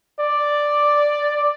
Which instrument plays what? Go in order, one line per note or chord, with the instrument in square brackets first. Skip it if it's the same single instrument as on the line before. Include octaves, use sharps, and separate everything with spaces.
[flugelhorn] D5